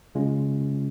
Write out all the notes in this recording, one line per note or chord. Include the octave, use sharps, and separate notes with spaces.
C#3 G#3 C#4 F4